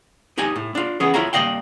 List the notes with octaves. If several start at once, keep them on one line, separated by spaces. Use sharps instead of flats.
D#4 G4 D#5 G#5
A2
D4 F4
E3 B3 C#4 G#4
E4 F4 A4 C#5 F5 A#5
G2 A#3 D5 D#5 F5 G5